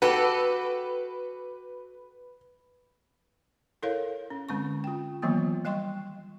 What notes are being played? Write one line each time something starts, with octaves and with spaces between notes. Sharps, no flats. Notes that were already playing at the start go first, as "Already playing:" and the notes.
F#4 G4 A4 B4
E4 A4 A#4 C#5 F5
C#4
D3 G#3 C4 C#4 C#6
F4 G5
D#3 E3 F#3 A#3 B3 F4
G3 D#5 G5 C6 C#6